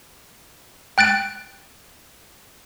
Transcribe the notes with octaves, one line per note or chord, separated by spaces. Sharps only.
G5 F#6 A6 D7